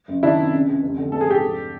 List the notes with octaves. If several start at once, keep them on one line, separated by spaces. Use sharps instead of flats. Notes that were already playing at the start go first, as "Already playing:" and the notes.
F#1
D#3 D4 E4
C3
C#3
C#2
F1
D3
A#1 A4
G#4
G#2 G4 A4
F1